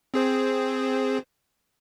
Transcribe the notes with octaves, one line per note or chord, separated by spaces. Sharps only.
C4 G#4 C5